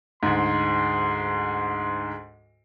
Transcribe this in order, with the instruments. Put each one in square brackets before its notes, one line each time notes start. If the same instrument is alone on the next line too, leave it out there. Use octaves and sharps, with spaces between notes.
[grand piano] D2 G#2 [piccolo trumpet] C6